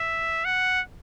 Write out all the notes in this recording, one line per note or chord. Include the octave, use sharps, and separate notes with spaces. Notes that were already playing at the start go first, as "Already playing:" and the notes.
Already playing: E5
F#5